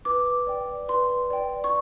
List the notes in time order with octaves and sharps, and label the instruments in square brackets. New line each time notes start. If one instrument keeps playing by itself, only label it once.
[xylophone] B4 D6
D5 G5
B4 C6
D5 G5
C#6